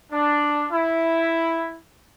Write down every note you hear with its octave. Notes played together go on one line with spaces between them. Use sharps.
D4
E4